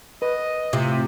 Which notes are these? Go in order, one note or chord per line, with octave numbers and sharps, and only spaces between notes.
B4 D#5
A2 C3 F4